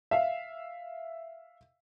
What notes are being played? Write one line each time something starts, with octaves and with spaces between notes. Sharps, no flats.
E5 F5